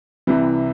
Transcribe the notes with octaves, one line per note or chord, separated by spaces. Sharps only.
C2 C3 E3